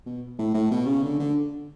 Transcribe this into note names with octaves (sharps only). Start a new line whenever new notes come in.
B2
A2
A2
B2
C#3
D3
D3